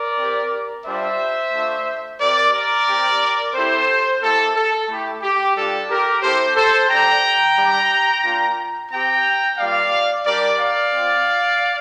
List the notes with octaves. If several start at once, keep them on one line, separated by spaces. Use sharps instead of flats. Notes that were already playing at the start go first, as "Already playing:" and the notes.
Already playing: A#4 D5
C4 G4
G3 D4 F4 C5 E5
A3 D4 F4
C4 G4 A#4 D5
A#4 D5
C4 G4
C4 E4 G4 A4 C5
A#3 E4 G4 A4
A4
A3 E4 G4
G4
G3 D4 F4 A4
G4 A#4
C4 E4 G4 A4 C5
A4 C5
G3 D4 G4 G5 A#5
G3 D4 G4
A#3 D4 F4
C4 G4 G5 A#5
G3 A#3 F4 D5 F5
G3 D4 G4 A#4 D5
D5 F5
C4 F4